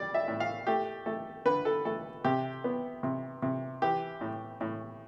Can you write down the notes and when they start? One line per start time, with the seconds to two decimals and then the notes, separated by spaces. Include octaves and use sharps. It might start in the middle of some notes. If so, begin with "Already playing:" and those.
Already playing: G3 D5
0.14 E5
0.28 A2
0.40 F5
0.67 A3 G4
1.06 A3 A4
1.45 D3 B4
1.65 A4
1.85 A3 A4
2.24 C3 G4
2.64 B3
3.03 C3
3.42 C3
3.82 E3 G4
4.21 A2
4.61 A2